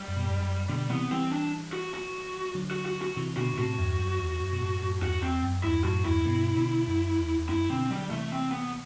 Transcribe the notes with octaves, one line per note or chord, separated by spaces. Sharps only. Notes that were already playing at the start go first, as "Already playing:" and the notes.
Already playing: G3
F#2
B2
A2
G2
F#2
B2 D3 G3
C3 E3 B3
E3 G3 C4
D4
F#4
F#4
D3 F#3
F#4
F#4
F#4
C3 E3
B2 D3 F#4
B2
A2 C3 F#4
E2 G2
F#2
E2
F#2
B2
F#2 A2
F#2 A2
E2 G2 F#4
E2 C4
F#2
E2 G2 E4
F#2 A2 F#4
E2 G2 E4
G2 B2
B2 D3
F#2
E2
E2
F#2 E4
B2 D3 C4
D3 F#3 G3
C3 E3 A3
C4
B3